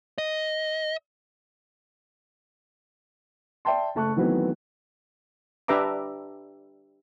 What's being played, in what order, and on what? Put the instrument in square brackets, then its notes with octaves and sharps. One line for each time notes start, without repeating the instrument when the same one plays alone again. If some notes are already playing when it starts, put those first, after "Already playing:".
[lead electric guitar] D#5
[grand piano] D5 E5 G5 A5 C6
F#1 A3 A5 C#6 F#6
D#3 E3 F#3 A3 B3 C4
[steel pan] D4 G4 B4 E5 A#5 D6